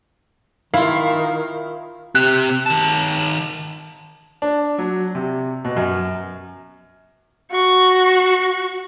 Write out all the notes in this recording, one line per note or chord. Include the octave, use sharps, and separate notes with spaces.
D#3 E4 F4 F5
C4 G4 F#6
D#3 A5
D4
F#3
C3
B2
F#2
F#4 C#6